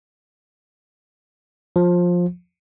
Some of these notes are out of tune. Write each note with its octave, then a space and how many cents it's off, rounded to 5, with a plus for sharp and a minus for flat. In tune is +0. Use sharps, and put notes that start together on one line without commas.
F3 +15